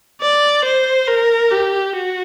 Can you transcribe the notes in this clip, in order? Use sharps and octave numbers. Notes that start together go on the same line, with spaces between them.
D5
C5
A#4
G4
F#4